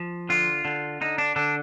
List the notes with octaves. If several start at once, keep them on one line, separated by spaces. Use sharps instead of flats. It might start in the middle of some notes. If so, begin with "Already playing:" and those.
Already playing: F3
D3 F4
D3
D3 D#4
D4
D3 D4